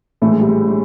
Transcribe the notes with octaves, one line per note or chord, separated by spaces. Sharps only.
A#1 A2 E3 A3
G#3
G3
G#3
G#3